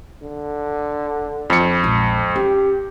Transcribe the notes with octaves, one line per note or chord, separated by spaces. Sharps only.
D3
F2 F3 C#7
A#1 G#3
C#4 G4